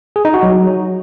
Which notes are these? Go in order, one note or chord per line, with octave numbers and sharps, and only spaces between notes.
G#4
D#4
F#4
F#3